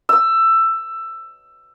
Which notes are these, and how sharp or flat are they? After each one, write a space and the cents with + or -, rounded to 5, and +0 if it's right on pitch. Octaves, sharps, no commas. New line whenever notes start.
E6 +15